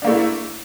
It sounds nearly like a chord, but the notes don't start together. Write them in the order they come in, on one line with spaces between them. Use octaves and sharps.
D4 A#3 A3 E4